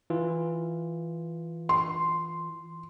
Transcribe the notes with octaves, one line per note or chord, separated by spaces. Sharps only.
E3 F4
C6